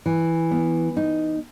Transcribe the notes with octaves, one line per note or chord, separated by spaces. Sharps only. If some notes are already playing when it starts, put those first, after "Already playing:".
E3
B3
D#4